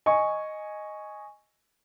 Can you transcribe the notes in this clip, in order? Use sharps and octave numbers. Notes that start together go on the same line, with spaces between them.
D#5 G#5 C#6